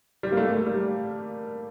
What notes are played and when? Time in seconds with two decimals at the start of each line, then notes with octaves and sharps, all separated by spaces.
0.23 G3
0.32 A#3
0.37 A3
0.52 A3
0.66 G3